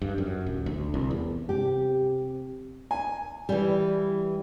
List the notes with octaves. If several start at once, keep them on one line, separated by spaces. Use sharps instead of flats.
G2
F#2
D1
D2
C2
E2
C3 G4
G#5
E3 G3